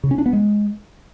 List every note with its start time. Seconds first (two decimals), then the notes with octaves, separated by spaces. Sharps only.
0.04 C#3
0.11 C#4
0.18 D4
0.26 B3
0.33 G#3